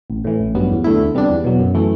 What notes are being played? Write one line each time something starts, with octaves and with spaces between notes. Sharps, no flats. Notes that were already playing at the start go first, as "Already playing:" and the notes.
A1
A2 E3
A1
G2 F#3 B3
E2
D3 A3 E4
D2
C3 G3 B3 D4
E2
B2 F#3
F#2
E3 A3